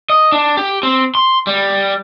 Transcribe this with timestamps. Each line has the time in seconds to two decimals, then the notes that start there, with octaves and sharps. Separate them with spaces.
0.10 D#5
0.32 D4
0.57 G4
0.83 C4
1.15 C6
1.47 G3